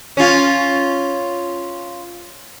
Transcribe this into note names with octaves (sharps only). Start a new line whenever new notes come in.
C#4 F4